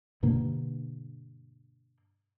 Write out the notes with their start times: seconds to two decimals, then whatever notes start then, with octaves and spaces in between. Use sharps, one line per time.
0.23 G2 B2 D3 A#3